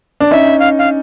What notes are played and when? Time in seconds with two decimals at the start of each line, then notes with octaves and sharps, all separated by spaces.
0.20 D4
0.31 C#4 D#4 E5
0.60 F5
0.79 F5